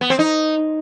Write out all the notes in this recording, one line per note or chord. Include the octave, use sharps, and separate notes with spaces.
B3
C4
D#4